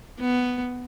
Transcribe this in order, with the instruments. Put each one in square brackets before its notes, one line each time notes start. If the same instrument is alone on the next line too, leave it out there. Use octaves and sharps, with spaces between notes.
[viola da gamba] B3